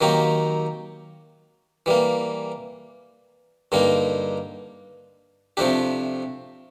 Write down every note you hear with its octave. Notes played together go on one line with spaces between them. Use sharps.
D#3 F#3 A#3 D#4 G4
E3 G3 A#3
G2 D3 G3 A#3 D#4
C3 F3 A3 D4 G4